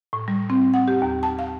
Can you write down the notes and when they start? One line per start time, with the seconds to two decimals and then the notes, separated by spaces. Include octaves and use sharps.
0.13 A2
0.28 G3
0.50 C4
0.74 F#5
0.88 G4
1.02 D#2
1.23 A5
1.39 F5